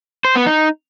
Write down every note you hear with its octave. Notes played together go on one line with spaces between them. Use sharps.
C5
B3
D#4